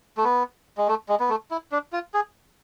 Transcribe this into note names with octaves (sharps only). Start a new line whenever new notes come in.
A3
B3
G#3
A3
G#3
B3
A3
E4
D4
F4
G#4